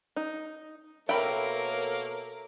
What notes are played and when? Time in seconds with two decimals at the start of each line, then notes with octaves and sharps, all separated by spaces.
0.16 D#4
1.09 B2 A#3 A4 A#4 C#5 E5 G5 B5